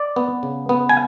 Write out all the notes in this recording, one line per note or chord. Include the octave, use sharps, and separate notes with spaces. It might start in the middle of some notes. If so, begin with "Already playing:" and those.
Already playing: D5
B3
C#3
B3
G#5